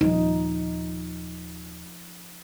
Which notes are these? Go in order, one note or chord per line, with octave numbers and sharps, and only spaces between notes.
D#1 F3 D#4